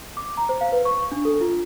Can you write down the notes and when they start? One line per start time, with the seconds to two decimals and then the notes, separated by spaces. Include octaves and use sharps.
0.17 D6
0.37 A#5
0.49 C5
0.61 F5
0.72 B4
0.85 C#6
1.12 D4
1.25 A4
1.41 F4